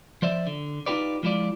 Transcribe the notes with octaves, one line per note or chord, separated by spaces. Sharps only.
F3 C5 D5 E5
D3
D#4 F4 G4 B4 D5
F3 G#3 E4 F4 D5